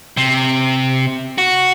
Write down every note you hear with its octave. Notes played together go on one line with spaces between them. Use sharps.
C3
F#4